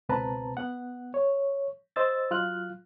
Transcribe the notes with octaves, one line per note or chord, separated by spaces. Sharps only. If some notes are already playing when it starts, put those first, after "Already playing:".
C#2 B2 C4 B4 A5 A#5
B3 F#5
C#5
C5 D#5 E6 A6
F#3 F4 F6 F#6